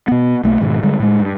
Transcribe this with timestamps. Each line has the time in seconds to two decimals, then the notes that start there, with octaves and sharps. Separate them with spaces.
0.08 B2 B3
0.44 B1 A3 A#3
0.60 G#2 B2 D#3 G#3
0.83 D3 G3 G#3
1.00 A2 G#3
1.19 G2